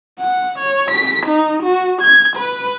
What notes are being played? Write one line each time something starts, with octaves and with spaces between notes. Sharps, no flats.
F#5
C#5
B6
D#4
F#4
G#6
B4